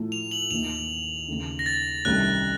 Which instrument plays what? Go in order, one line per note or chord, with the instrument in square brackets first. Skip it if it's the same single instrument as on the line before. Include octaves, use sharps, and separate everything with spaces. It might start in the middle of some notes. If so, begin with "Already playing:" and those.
Already playing: [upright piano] A2 F3 A3
[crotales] F7
F#7
[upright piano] D#2 D#3 A#3 D#4 [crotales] F7
[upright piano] D#2 C#3 A3 D#4
[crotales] A#6
A6
[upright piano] C2 C3 D#3 A3 C#4 [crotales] F#6